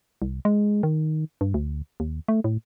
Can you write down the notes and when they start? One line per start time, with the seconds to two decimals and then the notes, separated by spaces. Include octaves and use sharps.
0.22 C2
0.45 G#3
0.83 D#3
1.41 G2
1.54 D2
2.00 D#2
2.28 A3
2.44 A2